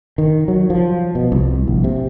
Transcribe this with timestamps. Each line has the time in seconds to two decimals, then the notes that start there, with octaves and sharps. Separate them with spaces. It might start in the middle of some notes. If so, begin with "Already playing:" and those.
0.18 D#3
0.48 F#3
0.70 F3
1.15 B2
1.32 C2
1.68 A#1
1.84 C3